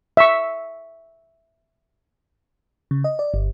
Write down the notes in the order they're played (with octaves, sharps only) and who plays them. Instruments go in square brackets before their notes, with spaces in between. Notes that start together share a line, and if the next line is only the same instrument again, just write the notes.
[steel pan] E5 C#6
[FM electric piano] C#3
D#5
D5
G1